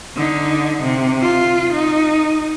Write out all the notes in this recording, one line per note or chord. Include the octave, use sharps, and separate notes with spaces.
D3 D#4
C3
F4
D#4